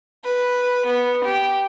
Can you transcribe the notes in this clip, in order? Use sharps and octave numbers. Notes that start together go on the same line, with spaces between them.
B4
B3
G4